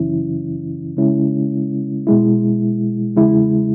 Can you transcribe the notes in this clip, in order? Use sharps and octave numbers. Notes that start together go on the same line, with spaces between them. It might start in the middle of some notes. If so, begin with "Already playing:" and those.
Already playing: F#2 C#3 E3 C#4 E4
C#3 G#3 C#4 E4
B2 G#3 E4
E2 C#3 G#3 E4